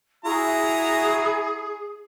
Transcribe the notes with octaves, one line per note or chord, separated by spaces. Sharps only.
E4 F#4 G#4 A#5